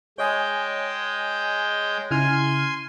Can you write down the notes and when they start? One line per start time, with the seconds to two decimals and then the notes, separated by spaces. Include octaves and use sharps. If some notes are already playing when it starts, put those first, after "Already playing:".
0.18 G#3 C#5 D#5 G5 G#5
2.11 C#3 E4 G#5 C6 F6